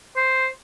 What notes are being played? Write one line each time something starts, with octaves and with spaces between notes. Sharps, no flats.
C5